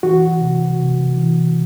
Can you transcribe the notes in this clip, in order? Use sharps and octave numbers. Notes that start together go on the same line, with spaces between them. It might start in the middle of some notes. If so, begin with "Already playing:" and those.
E3 F#4
C3
C3
E3